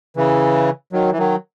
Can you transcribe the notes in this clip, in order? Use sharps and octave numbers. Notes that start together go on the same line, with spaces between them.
C#3 E3
D#3 F#3
E3
D#3 F#3